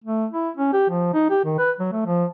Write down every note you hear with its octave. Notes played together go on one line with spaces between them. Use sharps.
A3
E4
C#4
G4
F3
D#4
G4
D#3
B4
F#3
A3
F3